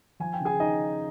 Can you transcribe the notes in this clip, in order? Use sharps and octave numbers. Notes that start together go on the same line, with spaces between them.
F3 G#5
G5
C#3
G#4 G#5
D#4 D#5